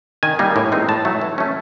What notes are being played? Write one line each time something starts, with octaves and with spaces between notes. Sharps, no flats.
D#3 G#5
G3 A#3 D#4
A2
E3 G#3 C4 D#4
A2 A5
F#3 A3
E3
A3 C#4